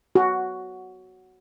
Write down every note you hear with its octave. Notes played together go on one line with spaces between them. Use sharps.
F#4